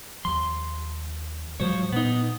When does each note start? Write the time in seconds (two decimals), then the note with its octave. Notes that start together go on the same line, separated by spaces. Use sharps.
0.25 D#2 F3 C6
1.60 A2 F3 F#3 G#3 C5 C#5
1.92 A#2 B3 D#4